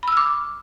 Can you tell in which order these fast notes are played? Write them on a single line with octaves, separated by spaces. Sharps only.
B5 E6 F6 D6